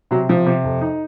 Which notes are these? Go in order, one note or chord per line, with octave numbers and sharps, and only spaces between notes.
C3 F#3
C3 F3
C3
F2
D#4